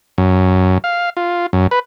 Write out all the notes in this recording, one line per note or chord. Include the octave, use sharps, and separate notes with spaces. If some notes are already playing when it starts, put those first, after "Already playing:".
F#2
F5
F4
F#2
B4